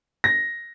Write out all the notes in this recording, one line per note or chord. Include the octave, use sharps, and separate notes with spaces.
A#6